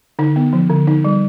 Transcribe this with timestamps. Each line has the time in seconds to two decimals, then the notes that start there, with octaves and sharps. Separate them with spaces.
0.19 D3 D#4
0.36 B3
0.53 F3
0.70 D3
0.87 D#4
1.05 G3